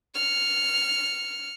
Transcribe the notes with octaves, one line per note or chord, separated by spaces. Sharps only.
F6 C#7